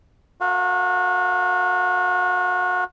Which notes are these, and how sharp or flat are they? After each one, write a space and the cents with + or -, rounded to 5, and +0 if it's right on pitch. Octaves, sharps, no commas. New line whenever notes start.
F#4 -30 A#4 -40 F5 +0